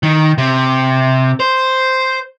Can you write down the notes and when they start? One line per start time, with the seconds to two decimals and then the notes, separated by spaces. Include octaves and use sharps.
0.03 D#3
0.38 C3
1.40 C5